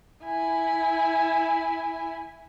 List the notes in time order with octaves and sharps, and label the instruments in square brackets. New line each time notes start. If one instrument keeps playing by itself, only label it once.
[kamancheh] E4 G#5